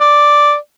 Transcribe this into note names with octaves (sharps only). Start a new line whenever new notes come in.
D5